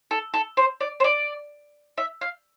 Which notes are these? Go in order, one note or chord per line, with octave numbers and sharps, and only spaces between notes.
A4
A4
C5
D5
C5
D5
E5
F5